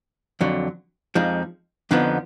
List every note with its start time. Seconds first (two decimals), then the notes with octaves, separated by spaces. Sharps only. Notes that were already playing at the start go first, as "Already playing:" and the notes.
0.41 F2 D3 F#3
1.15 F2 F3 G#3 D#4
1.91 F2 D3 F3 B3 D#4